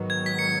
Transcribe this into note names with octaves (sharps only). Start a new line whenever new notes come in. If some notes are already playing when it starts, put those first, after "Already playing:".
Already playing: G#2 D#3 F#3 B3
G#6
B6
C#7